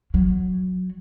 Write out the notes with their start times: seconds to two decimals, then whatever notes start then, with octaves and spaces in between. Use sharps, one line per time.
0.14 F#3